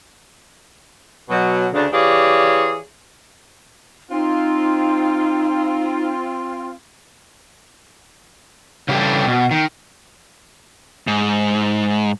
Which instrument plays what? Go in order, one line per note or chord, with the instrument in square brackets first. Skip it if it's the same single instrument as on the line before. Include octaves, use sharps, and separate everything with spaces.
[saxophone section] B2 F#3
D2 C#3 D4
E3 G4 G#4 C#5 D5 F5
[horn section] C4 F4 [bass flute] D#4
[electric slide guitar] C#3 E3 G3 G4 A4
B2
D#3
[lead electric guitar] G#2